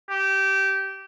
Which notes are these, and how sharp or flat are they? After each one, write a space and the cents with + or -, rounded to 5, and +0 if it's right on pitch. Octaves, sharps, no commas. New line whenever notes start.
G4 -20